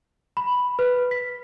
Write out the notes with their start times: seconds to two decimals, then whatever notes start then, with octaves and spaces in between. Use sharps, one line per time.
0.37 B5
0.79 B4
1.11 B6